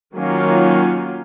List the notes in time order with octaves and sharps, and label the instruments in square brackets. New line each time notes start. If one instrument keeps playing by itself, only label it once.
[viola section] D#3 F#3 A#3 C#4 F4